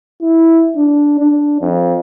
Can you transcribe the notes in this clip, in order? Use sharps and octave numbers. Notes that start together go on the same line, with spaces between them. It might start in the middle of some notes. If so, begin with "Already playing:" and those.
E4
D4
D4
F2